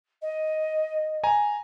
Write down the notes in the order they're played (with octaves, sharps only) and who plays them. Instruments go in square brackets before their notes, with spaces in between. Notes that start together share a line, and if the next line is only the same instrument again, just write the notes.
[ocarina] D#5
[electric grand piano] G#5 A#5